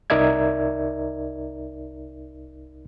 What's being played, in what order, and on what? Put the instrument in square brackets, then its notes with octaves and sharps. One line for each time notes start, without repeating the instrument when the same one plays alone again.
[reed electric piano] C2 D#4 A#4 D5 E5 G#6